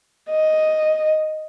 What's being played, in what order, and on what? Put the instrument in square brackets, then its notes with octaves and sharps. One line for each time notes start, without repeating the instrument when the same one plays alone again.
[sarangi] D#5